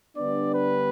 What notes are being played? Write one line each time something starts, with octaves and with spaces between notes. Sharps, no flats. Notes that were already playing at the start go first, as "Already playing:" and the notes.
D3 G3 B3 D4 D5
B4